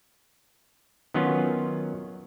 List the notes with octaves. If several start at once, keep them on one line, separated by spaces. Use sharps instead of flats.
D#3 F#3 B3 C#4 F4